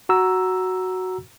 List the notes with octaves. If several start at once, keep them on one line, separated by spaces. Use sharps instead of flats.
F#4 A#5 E6